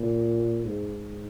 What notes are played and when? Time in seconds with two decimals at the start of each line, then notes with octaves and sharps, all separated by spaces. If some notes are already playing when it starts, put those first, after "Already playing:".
Already playing: A#2
0.65 G#2